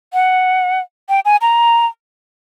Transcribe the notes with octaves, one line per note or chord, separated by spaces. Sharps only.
F#5
G5
G#5
A#5